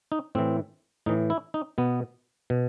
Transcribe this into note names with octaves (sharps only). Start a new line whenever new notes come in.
D#4
A2 E3 C4
A2 E3 D#4
E4
D#4
B2 B3
B2